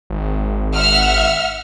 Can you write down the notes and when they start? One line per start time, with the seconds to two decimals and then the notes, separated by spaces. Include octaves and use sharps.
0.10 G#1
0.74 E5 F#5 F6